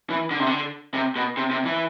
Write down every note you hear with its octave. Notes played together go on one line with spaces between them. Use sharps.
E3
D3
C3
D3
C3
B2
C3
C3
E3